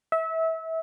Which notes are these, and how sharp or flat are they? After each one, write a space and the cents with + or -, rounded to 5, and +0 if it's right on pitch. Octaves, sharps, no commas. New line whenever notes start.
E5 -30